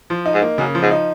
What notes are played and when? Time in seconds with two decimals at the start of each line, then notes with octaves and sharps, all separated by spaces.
0.10 F3
0.26 D#4
0.34 G#2
0.42 A#3
0.58 F#2 C#3
0.75 F3
0.83 G#2
0.91 D#4